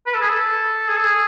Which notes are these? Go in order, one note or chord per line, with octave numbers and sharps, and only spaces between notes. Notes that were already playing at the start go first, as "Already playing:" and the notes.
B4
A4
G#4
A4
G#4
A4
G#4